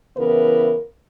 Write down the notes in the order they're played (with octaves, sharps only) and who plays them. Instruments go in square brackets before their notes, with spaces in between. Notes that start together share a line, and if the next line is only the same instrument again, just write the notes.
[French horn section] C#3 E3 B3 E4 A#4 B4